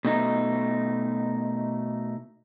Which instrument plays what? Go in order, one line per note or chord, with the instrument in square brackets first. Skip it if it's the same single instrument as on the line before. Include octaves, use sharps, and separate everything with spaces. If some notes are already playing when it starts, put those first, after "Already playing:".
[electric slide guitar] B2 A3 D#4